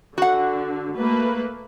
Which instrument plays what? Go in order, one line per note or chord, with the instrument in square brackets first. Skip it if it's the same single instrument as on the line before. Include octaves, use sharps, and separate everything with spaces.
[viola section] D3 [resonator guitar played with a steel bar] F#4 F#5
[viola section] A3 A#3 B4